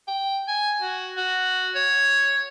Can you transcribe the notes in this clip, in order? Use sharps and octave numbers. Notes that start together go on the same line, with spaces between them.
G5
G#5
F#4
F#4
C#5